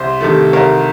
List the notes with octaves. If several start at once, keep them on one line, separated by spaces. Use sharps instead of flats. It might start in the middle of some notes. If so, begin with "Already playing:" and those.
Already playing: C2 C5
C3 D#3 A3
C2 A#4